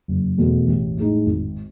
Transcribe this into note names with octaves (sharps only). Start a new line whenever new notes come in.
F#1
E2 B2 A3
A1
A2 G#3 D#4
G#1